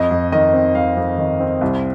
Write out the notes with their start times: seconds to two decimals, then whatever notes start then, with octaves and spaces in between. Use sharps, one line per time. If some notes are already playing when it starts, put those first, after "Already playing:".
Already playing: F2 D#5
0.11 F2
0.32 D#3 D#5
0.53 C4
0.75 F2 F5
0.97 F2
1.18 D#3
1.40 C4
1.61 C2